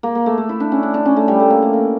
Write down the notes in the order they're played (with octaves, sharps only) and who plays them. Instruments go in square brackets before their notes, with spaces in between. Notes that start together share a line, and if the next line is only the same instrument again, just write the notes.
[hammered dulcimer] A#3
A#3
A3
A3
E4
D4
C#4
D4
D4
C#4
A3
G3
A3
A#3
A3
A#3